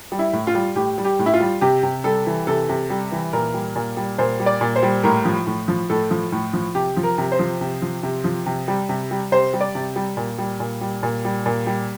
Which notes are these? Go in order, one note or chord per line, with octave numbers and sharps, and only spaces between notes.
G3
E4
A2
F4
G3
A2 G4
G3
G4
A2
E4
F4
G3
C3 G4
C3
G3 A4
E3
C3 A4
C3
G3
E3
A#2 A#4
G3
A#2
G3
A#2 C5
G3
D5
A#2
C5
G3
A2 A#4
F3
A2
F3
A2 A4
F3
A2
F3
C3 G4
F3
A#4
C3
C5
F3
C3
F3
C3
F3
C3
G3
C3
G3
C3 C5
G3
D5
C3
G3
A#2
G3
A#2
G3
A#2
G3
A#2
G3